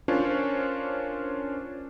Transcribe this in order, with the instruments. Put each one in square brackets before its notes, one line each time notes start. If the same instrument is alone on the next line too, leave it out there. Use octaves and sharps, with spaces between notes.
[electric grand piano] C#4 D4 F4 A#4 C5 C#5